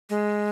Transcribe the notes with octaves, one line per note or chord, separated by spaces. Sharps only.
G#3